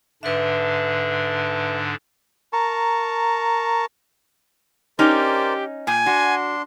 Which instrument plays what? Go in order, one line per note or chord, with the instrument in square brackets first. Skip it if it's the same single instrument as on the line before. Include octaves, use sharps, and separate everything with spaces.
[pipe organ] G#2 D3 D4 [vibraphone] B4 E5
[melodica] A#4 A5 A#5 C#6
[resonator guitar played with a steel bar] C#4 D#4 [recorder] G4 [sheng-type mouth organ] A#4 C5 D5
[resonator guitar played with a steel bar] A#2 [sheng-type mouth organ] G5 [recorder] G#5
[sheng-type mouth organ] D4 C6 [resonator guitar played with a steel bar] F#4